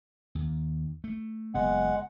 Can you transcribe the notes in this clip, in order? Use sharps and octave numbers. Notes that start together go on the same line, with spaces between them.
D#2
A3
F#1 G#3 B3 F#5